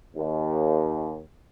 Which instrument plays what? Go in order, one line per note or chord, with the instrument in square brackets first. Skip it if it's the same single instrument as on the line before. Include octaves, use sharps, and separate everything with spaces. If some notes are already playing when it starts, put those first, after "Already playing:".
[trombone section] D#2